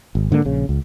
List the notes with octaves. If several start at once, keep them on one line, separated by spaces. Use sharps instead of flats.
G#1
G#2 D3 E3 A#3
A#1 C#3
C#2